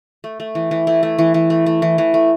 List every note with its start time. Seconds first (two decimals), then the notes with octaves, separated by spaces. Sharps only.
0.24 A3
0.40 A3
0.55 E3
0.71 E3
0.87 A3 E4
1.03 A3
1.19 E3
1.34 E3
1.50 A3
1.66 A3
1.82 E3
1.98 E3
2.14 A3